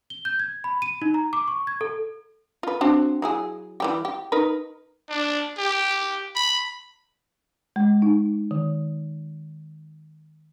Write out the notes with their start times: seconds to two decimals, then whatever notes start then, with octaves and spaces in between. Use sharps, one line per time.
0.10 G7
0.25 G6
0.40 G#6
0.64 B5
0.82 D#7
1.02 D#4
1.14 A#5
1.33 D6
1.48 C#6
1.67 G#6
1.81 A4
2.63 F4 B4
2.81 C4 D4 F#4
3.22 F#3 E4 G#4
3.80 E3 G3 G4
4.05 G4
4.32 D#4 A#4 B4
5.10 D4
5.58 G4
6.35 B5
7.76 G#3
8.02 D#4
8.51 D#3